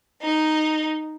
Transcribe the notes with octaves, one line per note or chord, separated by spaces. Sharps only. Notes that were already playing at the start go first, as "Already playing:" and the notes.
D#4